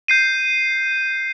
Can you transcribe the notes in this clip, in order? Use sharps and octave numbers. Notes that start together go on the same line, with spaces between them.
G6 C7 D#7